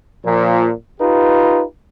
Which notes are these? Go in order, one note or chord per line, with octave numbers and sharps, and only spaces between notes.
A#2 F3
D#4 F4 G4 B4